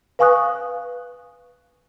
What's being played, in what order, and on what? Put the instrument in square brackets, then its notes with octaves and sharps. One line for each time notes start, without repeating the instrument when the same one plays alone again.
[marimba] B4 F5 G#5 C#6 D#6 F#6